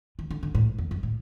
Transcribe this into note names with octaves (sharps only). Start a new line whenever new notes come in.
E3
D3
D3
A2
E2
F#2
A2